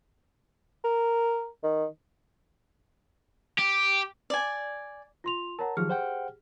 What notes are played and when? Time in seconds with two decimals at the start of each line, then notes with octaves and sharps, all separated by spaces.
0.84 A#4
1.63 D#3
3.59 G4
4.30 D5 G#5
5.24 F4 C6 F7
5.59 A#4 C#5 F#5 A5 A#5
5.77 D#3 F3 F#3 G4 G#4 F6
5.89 C5 F#5 G5